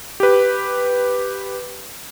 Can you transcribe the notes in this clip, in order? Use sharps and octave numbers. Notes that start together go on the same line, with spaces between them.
G4 B4